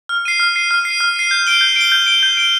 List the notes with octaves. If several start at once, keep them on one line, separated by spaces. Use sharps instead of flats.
F6
C7 D#7
F6
C7 D#7
F6
C7
D#7
F6
C7 D#7
G6
D7 G7
G6
D7 G7
G6
D7 G7
G6
D7 G7